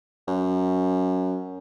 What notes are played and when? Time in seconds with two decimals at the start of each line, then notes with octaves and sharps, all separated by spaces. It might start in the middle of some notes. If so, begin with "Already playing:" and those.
0.28 F#2